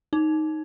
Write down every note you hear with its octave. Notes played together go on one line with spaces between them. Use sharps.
D#4